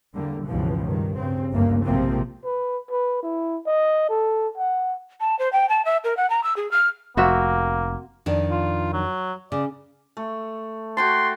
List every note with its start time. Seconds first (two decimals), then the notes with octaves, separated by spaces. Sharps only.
0.13 E2 D3 G3 A#3
0.45 C#2 G2 B2 E3 F3
0.85 G2 D#3
1.16 G2 C#3 C4
1.52 G1 D2 G2 C#3 A3 A#3
1.84 A#1 C3 F3 G#3 A#3 C4
2.44 B4
2.91 B4
3.23 E4
3.67 D#5
4.09 A4
4.58 F#5
5.20 A5
5.39 C5
5.53 G5
5.69 A5
5.85 E5
6.04 A#4
6.17 F#5
6.30 A#5
6.44 E6
6.57 G#4
6.71 F6
7.17 F1 A#3 C4 F#4 E5
8.26 F2 D#3 D4
8.51 F4
8.93 F#3
9.52 C#3 D5
10.17 A3
10.97 F#4 G5 A5 C6